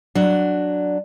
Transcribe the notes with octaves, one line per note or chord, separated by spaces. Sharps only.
F#3 D4